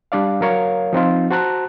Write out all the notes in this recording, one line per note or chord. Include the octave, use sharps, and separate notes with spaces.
G3 D4 D5 F5
F#3 A#4 C#5 F5
F3 C4 D#4 F4
F#4 C5 A5 A#5 F#6